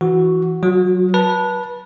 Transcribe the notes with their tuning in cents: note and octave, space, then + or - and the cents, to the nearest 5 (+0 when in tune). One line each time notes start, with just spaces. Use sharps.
E3 +0 F#4 +0
F#3 +0 F#4 -35
B4 -25 A5 +0